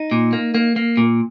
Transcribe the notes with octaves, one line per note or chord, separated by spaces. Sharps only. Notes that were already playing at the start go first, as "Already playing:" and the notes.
Already playing: D#4
A#2
A#3
A#3
A#3
A#2